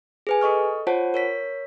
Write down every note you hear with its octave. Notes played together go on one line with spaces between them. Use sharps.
G#4 B4 G#5
A4 D#5 C#6 F6
F4 C5 C#5 F#5 A5
A#4 C#5 B6